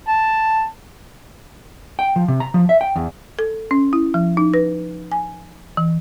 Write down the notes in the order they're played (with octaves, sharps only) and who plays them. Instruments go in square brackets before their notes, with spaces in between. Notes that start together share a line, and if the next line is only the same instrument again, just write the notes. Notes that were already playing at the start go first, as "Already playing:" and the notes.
[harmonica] A5
[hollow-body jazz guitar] G5
F3
C3
A#5
F3
E5
G5
E2
[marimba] A4
C#4
E4
F3
D#4
B4
G#5
E3